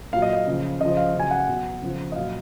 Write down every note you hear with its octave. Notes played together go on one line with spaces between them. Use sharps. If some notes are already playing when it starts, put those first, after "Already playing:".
A#2 F#3 F5
D#5
F5
C#3 F3
C#3 F3 D#5
F5
C#3 F#3 G#5
F#5
B2 F#3
C#3 F3
D#5
A#2 F#3 F5